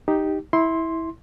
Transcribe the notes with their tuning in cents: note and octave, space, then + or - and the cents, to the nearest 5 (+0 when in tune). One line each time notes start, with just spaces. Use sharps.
D#4 +0 G4 +0
E4 -15 C6 +5